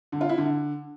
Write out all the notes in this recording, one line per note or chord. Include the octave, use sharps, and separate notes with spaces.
D3
F4
E4
D3